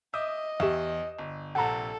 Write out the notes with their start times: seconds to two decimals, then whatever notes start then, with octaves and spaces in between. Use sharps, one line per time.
0.14 D#5 E5 D6 D#6 G6
0.60 E2 G4 E5 C#6 E7
1.19 G1
1.55 A#1 C3 A4 F#5 A#5